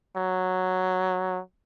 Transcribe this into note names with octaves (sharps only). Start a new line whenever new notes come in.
F#3